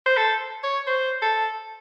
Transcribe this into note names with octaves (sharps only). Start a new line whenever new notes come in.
C5
A4
C#5
C5
A4